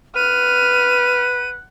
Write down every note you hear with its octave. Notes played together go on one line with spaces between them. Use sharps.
B4 F#5 F6 D#7